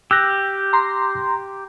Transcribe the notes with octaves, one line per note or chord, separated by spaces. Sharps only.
G4 E6 F#6 A#6
A#5 C6